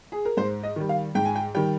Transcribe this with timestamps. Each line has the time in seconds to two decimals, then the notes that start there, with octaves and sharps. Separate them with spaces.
0.12 G#4
0.25 A#4
0.37 G#2 C5
0.63 D#5
0.76 D#3 G3
0.89 F5
1.15 G#2 G5
1.25 G#5
1.35 G5
1.54 D#3 G3 G5